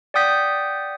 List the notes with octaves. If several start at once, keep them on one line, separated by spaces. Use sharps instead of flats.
D5 F#5 G5 D#6 G6 B6